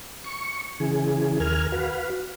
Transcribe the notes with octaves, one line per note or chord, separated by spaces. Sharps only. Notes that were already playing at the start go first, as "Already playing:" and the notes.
C#6
C#3 E3 G#4
D#2 A#4 G#5 F6
F#4 B4 F5